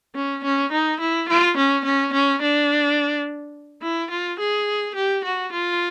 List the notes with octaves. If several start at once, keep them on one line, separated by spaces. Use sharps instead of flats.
C#4
C#4
D#4
E4
F4
C#4
C#4
C#4
D4
E4
F4
G#4
G4
F#4
F4